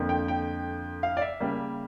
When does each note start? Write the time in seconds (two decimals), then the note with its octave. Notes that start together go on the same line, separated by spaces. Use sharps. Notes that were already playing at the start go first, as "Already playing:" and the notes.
Already playing: F2 D3 F3 A#3
0.09 G5
0.28 G5
1.03 F5
1.17 D5
1.22 E5
1.40 C#3 G3 A#3